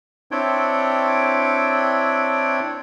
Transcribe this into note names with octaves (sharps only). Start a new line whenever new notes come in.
C4 D4 E4 C#5 G5